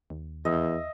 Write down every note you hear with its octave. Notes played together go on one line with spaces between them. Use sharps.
D#2
E2 D#5 E5